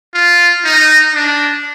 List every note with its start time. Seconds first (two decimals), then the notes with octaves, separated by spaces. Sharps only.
0.14 F4
0.65 D#4
1.15 D4